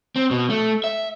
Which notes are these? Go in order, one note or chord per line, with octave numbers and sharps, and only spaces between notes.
C4
B2
A3
E5